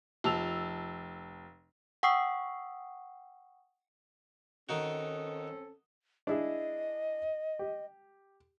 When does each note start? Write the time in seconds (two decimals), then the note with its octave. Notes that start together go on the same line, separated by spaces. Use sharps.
0.24 F1 F3 A5 E6 F7
2.03 F#5 G5 C#6 D#6 E6 C7
4.69 D#3 C4 C#4 D#4 F#4 A4
6.27 D4 E4 G#4 D#5
7.59 G4